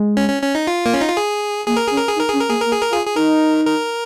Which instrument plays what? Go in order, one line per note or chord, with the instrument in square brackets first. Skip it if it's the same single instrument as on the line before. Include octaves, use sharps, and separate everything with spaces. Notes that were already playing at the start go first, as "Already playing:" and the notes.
Already playing: [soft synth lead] G#3
[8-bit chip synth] C#4
C#4
C#4
D#4
F4
A#3
C#4
D#4
F4
G#4
[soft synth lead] A#3 [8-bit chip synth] G#4
[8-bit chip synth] A#4
[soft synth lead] C#4 [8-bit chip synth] G#4
[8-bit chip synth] A#4
G#4
[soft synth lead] D#4
[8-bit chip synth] A#4
[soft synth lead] C#4 [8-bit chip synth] G#4
[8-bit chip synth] A#4
[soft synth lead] A#3 [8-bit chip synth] G#4
[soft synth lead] A#3 [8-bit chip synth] A#4
[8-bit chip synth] G#4
A#4
[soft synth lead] F4
[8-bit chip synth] G#4
G#4
[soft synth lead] D#4 [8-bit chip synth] A#4
[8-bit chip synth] A#4